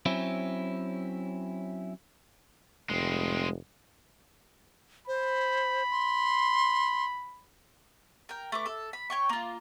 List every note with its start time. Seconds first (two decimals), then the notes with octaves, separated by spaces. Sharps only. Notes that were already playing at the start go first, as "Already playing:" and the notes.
0.06 F#3 C4 C#4 E4
2.90 F1 G#3 C4
5.08 C5 B5
5.90 C6
8.29 A#4 G5
8.52 A3 B4 D6
8.66 A4
8.93 B5
9.10 C#5 G5 C#6
9.29 A#3 F4